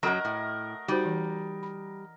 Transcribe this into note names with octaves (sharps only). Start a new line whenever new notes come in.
F#2 F#3 A#4 D#5 F#5 B5
A2
G3 D#4 F#4 C5
E3
B5